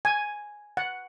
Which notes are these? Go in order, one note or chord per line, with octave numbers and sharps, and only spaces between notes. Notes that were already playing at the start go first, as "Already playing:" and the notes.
G#5
F#5